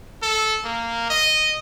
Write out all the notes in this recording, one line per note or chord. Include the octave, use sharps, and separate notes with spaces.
A4
A#3
D#5